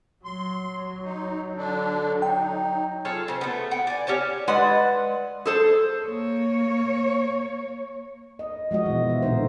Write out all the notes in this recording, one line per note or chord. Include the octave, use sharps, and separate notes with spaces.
F#3 C6
D#4
D3 D4
D#4 G5
F4 G#4 A4 C#5
C#3 C5
A3 B3
F#5 G5
D5 G#5
C#4 G4 C#5 A5
G#3 B4 D5 F#5
G#4 A4 C5
A#3 C#5
D#5
F3 G#3 F#4 D#5
B2 E3
E5
A#2 D3 D#4 C5